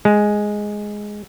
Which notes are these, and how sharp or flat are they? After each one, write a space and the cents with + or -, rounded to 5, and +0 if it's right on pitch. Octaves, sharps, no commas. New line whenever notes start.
G#3 +0